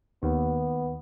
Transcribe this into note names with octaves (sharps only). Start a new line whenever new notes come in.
D#2 B3